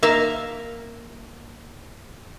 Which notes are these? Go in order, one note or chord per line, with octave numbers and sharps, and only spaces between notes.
A#3 E5 F5